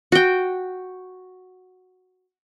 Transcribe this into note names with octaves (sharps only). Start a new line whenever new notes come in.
F#4 G5